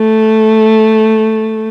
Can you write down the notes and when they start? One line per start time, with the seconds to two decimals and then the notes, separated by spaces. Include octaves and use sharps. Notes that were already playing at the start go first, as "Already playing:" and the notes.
Already playing: A3